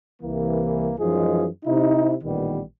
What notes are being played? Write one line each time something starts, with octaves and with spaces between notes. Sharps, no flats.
C2 E3 A#3
F#2 E3 F3 G#3 D#4 G#4
C3 D#4 E4
A1 A#2 D#3 G3 B3